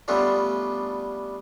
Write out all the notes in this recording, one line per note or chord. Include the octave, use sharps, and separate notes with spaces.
G3 A3 B3 C#4 D4 F4